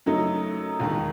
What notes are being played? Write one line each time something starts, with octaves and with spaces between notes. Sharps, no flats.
F#2 C#3 F#3 A3 D#4
E1 D#2 D#3